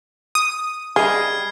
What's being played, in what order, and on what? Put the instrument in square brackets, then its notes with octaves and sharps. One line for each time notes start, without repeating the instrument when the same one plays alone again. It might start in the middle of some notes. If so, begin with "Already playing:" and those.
[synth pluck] D#6
[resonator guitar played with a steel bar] G3 D#5 [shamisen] G#4 [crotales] F6 G#6 C7